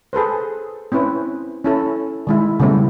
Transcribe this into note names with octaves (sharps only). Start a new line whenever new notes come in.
G#4 A4 B4 C5
C4 C#4 E4 B4 C5
C#4 E4 A4
D#3 G#3 E4
C#3 G3 A3 B3 E4